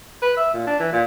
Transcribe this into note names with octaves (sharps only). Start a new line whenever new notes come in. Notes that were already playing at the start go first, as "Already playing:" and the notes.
B4
E5
A#2
D4
E3
A#2